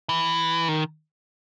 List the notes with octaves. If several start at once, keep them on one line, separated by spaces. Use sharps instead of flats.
E3
D#3